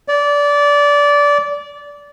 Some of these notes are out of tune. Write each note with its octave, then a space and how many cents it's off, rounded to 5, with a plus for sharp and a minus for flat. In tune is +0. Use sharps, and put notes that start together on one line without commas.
D5 -20